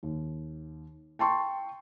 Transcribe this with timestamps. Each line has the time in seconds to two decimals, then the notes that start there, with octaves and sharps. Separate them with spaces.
0.03 D#2
1.19 G5 A5 C6 C#6